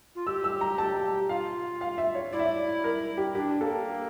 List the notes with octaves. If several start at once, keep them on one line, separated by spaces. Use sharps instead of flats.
F4
G4 E6
E6
A#5
A5
F4 F5
F5
E5
C#5
E4 D5
E5
D5
A#4
G4
D4 G4
A#3 A4